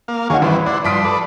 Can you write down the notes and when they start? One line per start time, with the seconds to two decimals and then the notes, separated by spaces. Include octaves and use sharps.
0.08 A#3 F5
0.30 D#2 D#4 F#4 G#4 C#5 F5
0.42 A1 G3 E4 B4 C5
0.66 E4 D5 F#5 C6
0.85 G2 F3 C6 D#6 B6 D7
1.05 A4 B4 D5